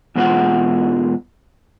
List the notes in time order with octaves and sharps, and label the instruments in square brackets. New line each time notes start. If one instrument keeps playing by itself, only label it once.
[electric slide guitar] E2 B2 G#3 D4 F4 F#5